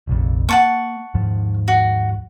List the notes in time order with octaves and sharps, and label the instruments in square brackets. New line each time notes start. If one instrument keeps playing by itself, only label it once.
[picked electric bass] F1 A#1 F2
[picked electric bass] A#3 [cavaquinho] F#5 A5 C#6
[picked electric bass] D#2 G#2 F3
[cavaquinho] F#4